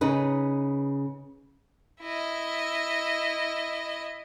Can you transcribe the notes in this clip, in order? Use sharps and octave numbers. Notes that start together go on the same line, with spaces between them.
C#3 D#4 B4
E4 D#5